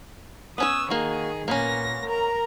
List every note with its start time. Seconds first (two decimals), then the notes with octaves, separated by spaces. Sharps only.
0.58 B3 C#4 C#5 D#6 E6
0.90 D#3 A#3 F#4 G#4
1.48 A#2 A#3 B3 C#4 A#6
2.05 A#4 A#5